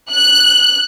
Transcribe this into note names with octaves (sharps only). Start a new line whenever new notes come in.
F#6